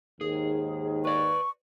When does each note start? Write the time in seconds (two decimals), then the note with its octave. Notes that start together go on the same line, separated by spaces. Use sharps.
0.21 D#2 G#2 D#3 G#4
1.05 B4 D5 C#6